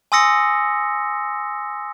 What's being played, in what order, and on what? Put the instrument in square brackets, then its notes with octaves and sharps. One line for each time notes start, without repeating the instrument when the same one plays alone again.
[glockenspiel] G#5 C6 D#6 E6 A#6 C#7